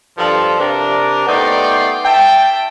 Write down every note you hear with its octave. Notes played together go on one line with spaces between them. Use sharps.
G2 F3 A4
C3 D4 A#4
A3 B3 D#4 D5 G5 C6
E5 G5 A5